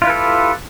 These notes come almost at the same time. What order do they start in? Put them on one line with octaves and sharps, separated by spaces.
F4 E4 B4 A4 G4